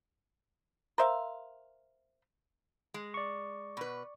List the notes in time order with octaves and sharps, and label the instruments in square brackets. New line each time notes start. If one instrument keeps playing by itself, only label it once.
[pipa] A#4 C5 E5 F5
[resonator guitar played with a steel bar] G#3
[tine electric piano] D5 C#6
[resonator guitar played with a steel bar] B2 B4